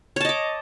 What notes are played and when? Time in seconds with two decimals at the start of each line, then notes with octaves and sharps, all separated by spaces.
0.16 C#5
0.21 A5
0.25 D#5
0.29 D6